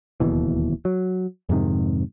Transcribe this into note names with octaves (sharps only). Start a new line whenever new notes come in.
D1 D#2 B2 E3
F#3
F2 G#2 C3 D#3